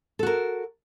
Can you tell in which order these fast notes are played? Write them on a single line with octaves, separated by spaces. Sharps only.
A4 F#4 A#4